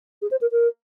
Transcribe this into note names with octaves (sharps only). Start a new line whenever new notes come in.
G#4
C5
A#4
A#4